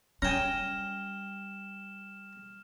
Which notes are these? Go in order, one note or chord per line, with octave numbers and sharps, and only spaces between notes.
G3 C#4 G5 G#5 A#5 F6 E7